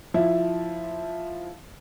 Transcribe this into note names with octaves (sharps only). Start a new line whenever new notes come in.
F3 E4